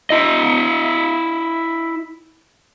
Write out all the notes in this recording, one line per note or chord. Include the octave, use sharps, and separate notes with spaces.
E4 D#5